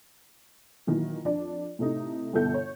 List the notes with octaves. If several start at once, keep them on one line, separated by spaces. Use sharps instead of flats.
A#2 D#3 E3 F#3
F2 D4 D5
A2 C3 A3 D#4
G1 B2 D3 E4 A4 G6
C#5